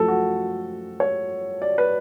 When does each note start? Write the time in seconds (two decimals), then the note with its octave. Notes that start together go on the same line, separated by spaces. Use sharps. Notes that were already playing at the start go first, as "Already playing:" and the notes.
Already playing: F#2 F3 A3 A4
0.08 F#4
1.00 C#5
1.62 D5
1.78 B4